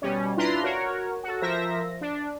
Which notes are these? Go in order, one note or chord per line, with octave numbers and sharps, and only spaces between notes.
B2 G3 C#4
D4 E4 F4 B4 A#5 C6
F#4 A#4 C#5
F#4 A4
F3 A#4 C5 E5 A#6
D4